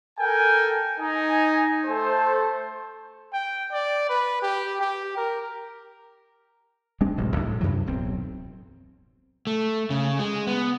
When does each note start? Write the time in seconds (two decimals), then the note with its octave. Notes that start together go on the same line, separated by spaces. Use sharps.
0.20 A4 A#4 G5 G#5
0.99 D#4 G#5
1.85 A3 A4 C5
3.33 G5
3.72 D5
4.09 B4
4.42 G4
4.81 G4
5.17 A#4
7.01 G3 G#3 C4 D4
7.17 D1 A1 C3 F#3
7.36 B1 A2
7.61 F#2 C3 E3 F#3
7.86 D1 B1 C4
9.47 A3
9.90 C#3
10.19 G#3
10.47 B3